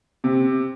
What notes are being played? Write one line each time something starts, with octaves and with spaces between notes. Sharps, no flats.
C3